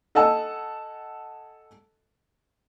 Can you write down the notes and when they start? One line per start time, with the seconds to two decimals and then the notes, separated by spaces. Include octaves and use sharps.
0.15 A4 D#5 F#5 G#5 A5 E6